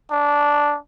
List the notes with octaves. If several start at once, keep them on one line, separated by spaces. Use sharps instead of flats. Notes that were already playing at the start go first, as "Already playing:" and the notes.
D4